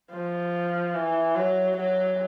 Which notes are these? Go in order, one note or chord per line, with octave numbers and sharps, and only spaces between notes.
F3
E3
F#3
F#3